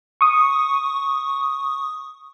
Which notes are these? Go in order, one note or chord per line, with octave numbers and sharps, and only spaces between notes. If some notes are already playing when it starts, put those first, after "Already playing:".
C#6 D#6